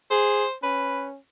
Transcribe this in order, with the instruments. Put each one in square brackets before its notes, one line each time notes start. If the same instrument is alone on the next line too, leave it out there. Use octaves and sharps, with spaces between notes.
[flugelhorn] G#4 [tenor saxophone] C5
[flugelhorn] C#4 [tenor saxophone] B4